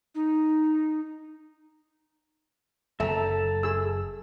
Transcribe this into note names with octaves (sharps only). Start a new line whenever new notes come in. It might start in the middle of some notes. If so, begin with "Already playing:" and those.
D#4
F#1 A4 E5 A5 A#5
G#4 E6